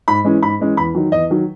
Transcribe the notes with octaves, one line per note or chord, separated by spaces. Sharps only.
G#2 B5
E3 G#3 C#4
G#2 B5
E3 G#3 C#4
E2 B5
D#3 F#3
E2 D#5
D#3 F#3